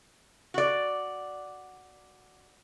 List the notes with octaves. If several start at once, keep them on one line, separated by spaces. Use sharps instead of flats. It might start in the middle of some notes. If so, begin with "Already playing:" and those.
F#4 D5